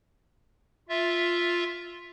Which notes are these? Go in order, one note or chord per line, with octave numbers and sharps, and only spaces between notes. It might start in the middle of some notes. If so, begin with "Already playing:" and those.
F4 E5